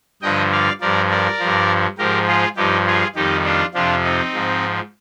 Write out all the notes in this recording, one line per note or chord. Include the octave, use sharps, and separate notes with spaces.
G2 D3 F3 D#5 G5
D5 F5
G2 F3 A#4 D5
A#4 D5
G2 F3
G#2 F3 G4 A#4
F4 G#4
G2 F3 D#4 G4
F4 G#4
F2 D#3 G3 D#4 G4
D4 F4
F2 C3 F3 D4 F4
C4 D#4
G#2 F3